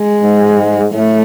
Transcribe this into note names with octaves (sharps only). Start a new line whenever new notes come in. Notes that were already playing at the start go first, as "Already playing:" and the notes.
Already playing: G#3
G#2
A2 A3